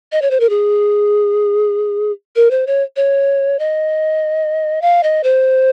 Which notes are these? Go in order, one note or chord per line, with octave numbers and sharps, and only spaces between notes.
D#5
C#5
C5
A#4
G#4
A#4
C5
C#5
C#5
D#5
F5
D#5
C5